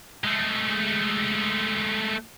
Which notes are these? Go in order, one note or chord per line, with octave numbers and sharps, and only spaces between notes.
G#3 A3